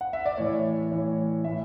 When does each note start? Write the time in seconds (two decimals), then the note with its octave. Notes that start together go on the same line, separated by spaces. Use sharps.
0.01 F#5
0.13 E5
0.26 D5
0.38 A2 E3 C#5
0.91 A2 E3 C#5
1.44 A2 E3 E5